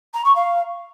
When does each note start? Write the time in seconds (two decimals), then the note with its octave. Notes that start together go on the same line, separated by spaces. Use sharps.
0.14 A#5
0.25 C#6
0.35 F5